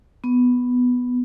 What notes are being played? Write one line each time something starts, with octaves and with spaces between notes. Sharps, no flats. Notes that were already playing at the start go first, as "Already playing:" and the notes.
B3